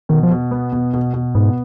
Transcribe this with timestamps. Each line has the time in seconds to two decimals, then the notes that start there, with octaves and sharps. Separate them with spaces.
0.09 B2 D#3
0.23 F3
0.31 B2
0.51 B3
0.72 B2
0.93 B2
1.14 B2
1.35 G#2 B3